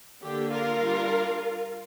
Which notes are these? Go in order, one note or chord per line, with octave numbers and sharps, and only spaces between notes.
D3 A#3 D4 G4
F4 A#4
G3 D4